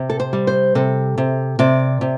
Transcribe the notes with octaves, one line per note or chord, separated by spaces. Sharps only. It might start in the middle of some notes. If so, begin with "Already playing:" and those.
Already playing: C3
A4
C5
G3
C5
C3 A4
C3
C3 D5
C3